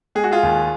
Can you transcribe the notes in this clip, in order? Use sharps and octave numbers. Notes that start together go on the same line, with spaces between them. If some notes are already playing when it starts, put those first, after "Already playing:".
G#3 G#4
F#4
F4 G#4
D#2